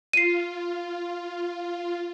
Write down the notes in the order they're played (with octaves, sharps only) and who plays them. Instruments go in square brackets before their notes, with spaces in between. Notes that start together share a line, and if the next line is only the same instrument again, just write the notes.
[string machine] F4 [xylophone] C7 D#7